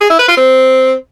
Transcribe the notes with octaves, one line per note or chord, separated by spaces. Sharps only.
G#4
E4
B4
F4
C4